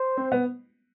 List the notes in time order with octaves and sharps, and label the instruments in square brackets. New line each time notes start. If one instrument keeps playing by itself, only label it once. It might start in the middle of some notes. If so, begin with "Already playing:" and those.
Already playing: [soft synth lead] C5
[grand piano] C4
B3